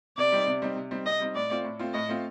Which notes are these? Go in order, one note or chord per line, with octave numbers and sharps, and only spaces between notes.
C3 D5
G3 C4 D#4
C3
G3 C4 D#4
C3
G3 C4 D#4
C3 D#5
G3 C4 D#4
A2 D5
A3 C4 F4
A2
A3 C4 F4
A2 D#5
A3 C4 F4